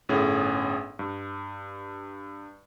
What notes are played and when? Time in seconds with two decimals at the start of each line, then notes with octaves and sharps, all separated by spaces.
0.09 G1 A2 C#4 G#4
0.99 G2